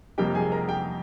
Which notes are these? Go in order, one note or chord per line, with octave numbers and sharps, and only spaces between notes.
F2 C3 G3 A#3 G4 G5
G#4 G#5
A#4 A#5
G4 G5